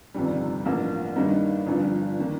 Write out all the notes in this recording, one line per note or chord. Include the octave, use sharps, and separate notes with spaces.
G1 F2 C3 D#3 G3
A1 G2 F3 A#3
G2 D#3 G3 A#3 D#4
G1 G2 F3
D#3 A#3